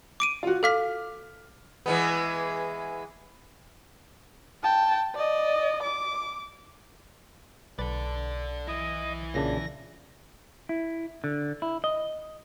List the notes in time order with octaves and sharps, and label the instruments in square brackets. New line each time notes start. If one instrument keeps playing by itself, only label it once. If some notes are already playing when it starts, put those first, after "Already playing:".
[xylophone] D6 D7 D#7
[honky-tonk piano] F4 F#4
[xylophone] A4 F5 B6 [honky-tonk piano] D6 F6
[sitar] E3 G#3 B3
[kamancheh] G5 A5
D5 D#5
D6
[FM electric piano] B1 [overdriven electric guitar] A4 D5 [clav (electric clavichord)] B4
[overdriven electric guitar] E3 E4 [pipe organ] D#5
[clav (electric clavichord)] A#2 C#3 D4 [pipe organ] A#6
[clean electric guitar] E4
D3
E4
D#5